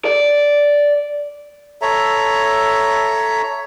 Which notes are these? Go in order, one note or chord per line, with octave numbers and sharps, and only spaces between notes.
D5
A4 C#5 E5 A#5